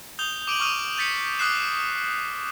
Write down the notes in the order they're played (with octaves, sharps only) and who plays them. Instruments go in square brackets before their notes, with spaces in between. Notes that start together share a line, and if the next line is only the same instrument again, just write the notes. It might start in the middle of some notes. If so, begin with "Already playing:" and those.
[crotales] D#6 G6 F7 G7
D6 D7 D#7 F#7
C#6 D#6 F6 D#7 F7
G6 A6 B6 C#7
D6 D#6 F6 F#6 C7 E7